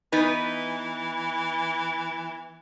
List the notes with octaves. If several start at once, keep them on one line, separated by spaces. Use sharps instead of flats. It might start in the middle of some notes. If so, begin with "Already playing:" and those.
E3 B3 D#4 B4